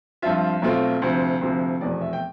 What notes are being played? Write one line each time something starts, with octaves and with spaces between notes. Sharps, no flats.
G2 F3 C4 F4 E5
B1 B2 A3 C4 F4
D2 C3 F3
D2 C3 F3
F1 E2 B2 D5
E5
G5